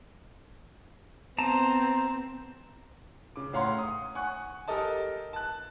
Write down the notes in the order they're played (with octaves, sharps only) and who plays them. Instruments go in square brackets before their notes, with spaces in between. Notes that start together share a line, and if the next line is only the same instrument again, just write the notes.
[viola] B3 C4 [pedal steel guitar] A5 A#5
[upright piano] C#3 D6
A2 C#4 F5 F#5 A#5 C6
D#6
F#5 G#5 C#6 F#6
G4 A4 A#4 D#5 A5
A5 F#6